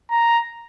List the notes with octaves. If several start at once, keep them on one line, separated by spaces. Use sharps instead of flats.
A#5